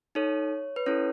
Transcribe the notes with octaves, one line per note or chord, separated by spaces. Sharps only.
D#4 A4 C#5
B4
C#4 E4 A4 C#5